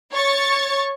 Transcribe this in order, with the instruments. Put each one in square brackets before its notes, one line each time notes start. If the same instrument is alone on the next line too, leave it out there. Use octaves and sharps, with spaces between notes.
[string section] C#5 C#6 A6